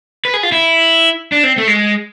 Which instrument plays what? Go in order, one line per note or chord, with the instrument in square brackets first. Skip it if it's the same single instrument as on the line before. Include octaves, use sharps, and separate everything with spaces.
[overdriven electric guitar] B4
G#4
F4
E4
D4
C4
A3
G#3